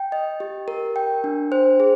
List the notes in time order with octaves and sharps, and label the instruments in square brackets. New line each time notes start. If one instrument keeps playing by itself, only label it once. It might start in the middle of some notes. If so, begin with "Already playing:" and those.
Already playing: [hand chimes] G5
D#5
G4
A#4
G5
D4
C5
G#4